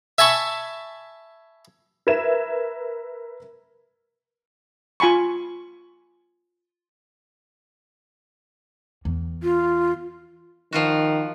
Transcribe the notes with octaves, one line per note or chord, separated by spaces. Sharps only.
E5 G#5 A5 B5 C#6
A#4 B4 E5 G#6 E7
F4 G#5 B5 C#6
E2
F4
D#3 F3 F4 F#4